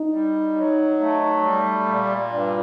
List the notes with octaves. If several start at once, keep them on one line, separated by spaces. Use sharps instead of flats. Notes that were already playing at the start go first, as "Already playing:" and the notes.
Already playing: D#4
G3
F#3
A3
G3
A#2
G2